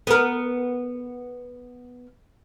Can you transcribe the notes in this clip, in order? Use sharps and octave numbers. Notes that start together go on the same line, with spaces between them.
B3 A#4